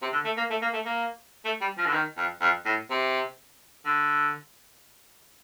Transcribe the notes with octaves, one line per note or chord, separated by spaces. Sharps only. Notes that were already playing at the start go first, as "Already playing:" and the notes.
C3
D3
A3
A#3
A3
A#3
A3
A#3
A3
G3
F3
D3
D#3
F2
F2
A2
C3
D3